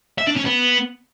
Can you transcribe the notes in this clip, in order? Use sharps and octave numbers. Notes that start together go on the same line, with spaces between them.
E5
D4
C#4
B3